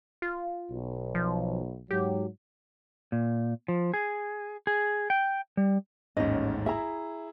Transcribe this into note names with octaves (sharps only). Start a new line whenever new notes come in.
F4
B1
F3
G#2 F#3 G4
A#2
F3
G#4
G#4
G5
G3
A1 D#2 G#2 C#4 D#5
E4 G#4 E5 A#5